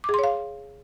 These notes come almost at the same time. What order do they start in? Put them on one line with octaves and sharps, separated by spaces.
D6 G#4 C6 C#5 F5